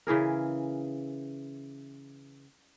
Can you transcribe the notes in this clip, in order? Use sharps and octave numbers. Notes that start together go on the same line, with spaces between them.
C#3 E3 G#4 A#4